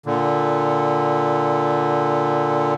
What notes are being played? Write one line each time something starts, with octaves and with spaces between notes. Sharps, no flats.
A#2 D3